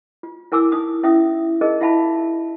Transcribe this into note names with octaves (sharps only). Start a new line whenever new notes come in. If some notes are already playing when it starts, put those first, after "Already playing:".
F4
E4 A#4 G#5 D6 E6
D#4 D#6
C#4 E4 E5 D#6
D#4 G#4 A#4 D#5
E4 F4 E5 F5 A5 B5